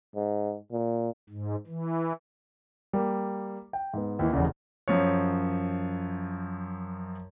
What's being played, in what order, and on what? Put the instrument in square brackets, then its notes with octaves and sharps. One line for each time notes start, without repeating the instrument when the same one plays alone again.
[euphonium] G#2
A#2
[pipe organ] G#2
E3
[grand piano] G3 A#3
G5
G#2 B3
D#2 E3
F1 E2 C#3
F#2 F3 C#5